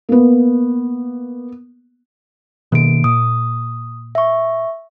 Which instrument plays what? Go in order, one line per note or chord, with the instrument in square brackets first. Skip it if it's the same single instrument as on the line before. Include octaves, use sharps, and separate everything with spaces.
[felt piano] A#3 B3
[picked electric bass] B2 D#3 [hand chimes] A#3 D7
[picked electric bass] A#2 [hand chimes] D#6
[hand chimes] E5 C#6